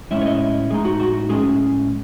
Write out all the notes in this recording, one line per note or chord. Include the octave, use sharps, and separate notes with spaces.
A2 G#3 C#4 E4 E5
C#5
D#5
A2 G#3 D#4 G#4
F#4
F#4
A2 G#3 C#4 G#4